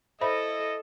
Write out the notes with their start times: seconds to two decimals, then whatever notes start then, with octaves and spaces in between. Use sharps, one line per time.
0.21 E4 A4 C5 D#5 E5 B5